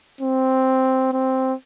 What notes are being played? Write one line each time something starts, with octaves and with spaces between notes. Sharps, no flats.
C4
C4